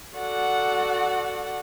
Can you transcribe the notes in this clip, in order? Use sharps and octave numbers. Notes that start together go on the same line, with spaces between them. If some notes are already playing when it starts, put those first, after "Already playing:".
F#4 A4 D5 F#5